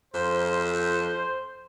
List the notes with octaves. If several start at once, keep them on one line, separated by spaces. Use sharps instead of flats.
F2 C5